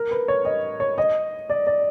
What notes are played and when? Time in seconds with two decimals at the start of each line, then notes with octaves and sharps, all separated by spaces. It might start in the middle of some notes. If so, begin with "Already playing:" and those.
Already playing: A#4
0.11 B4
0.28 C#5
0.45 D#5
0.80 C#5
0.98 D#5
1.50 D5
1.67 D5